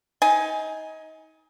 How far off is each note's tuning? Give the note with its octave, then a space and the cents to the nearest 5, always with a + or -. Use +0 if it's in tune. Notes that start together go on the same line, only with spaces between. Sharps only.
D#4 +30 G#5 +0